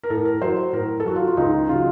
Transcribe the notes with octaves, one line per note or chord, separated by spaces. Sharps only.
A#4
A2 A4
A#4
F#3 C5
A2 A#4
A4
F#3 F#4
F4
F4
C#2 D#4
C#3 F#3 F4